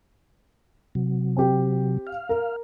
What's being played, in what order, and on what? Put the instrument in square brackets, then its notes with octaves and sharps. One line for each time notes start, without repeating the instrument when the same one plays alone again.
[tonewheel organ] C3 F#3
[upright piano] C4 G4
[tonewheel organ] F5
[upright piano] A#4